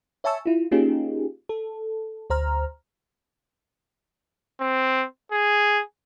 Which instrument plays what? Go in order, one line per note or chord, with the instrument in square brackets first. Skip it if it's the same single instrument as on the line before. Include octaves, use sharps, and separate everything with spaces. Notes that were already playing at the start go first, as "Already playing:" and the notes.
[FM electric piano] C#5 E5 G#5 A5 C#6 E6
E4 F4
A#3 C#4 D#4 F4 G4 G#4
A4
D2 C5 A#5 F6
[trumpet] C4
G#4